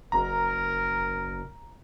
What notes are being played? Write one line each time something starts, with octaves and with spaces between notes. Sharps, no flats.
F#1 A#4 A#5